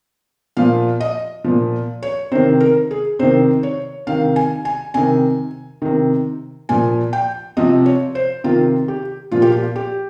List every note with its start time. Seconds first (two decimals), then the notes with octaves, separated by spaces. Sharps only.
0.57 A#2 F3 F5
1.00 D#5
1.44 A#2 F3
2.03 C#5
2.32 C3 D#3 C5
2.60 A#4
2.91 G#4
3.19 C3 D#3 C5
3.63 C#5
4.07 C3 D#3 F5
4.36 G#5
4.65 G#5
4.94 C3 D#3 G#5
5.82 C3 D#3
6.69 A#2 F3 G#5
7.13 G5
7.57 C3 F3 D#5
7.86 C#5
8.15 C5
8.44 C3 D#3 F4
8.88 G4
9.31 A#2 F3 F4
9.42 G4
9.52 F4
9.76 G4